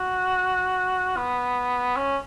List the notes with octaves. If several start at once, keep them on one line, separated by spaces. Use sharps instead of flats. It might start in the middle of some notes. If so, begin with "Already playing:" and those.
Already playing: F#4
B3
C#4